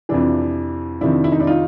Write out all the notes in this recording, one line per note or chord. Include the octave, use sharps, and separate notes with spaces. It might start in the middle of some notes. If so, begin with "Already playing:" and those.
F2 C3 E3 D4
F2 C3 D#3 D4 E4
E4
D#4
D4 E4
D#4 F4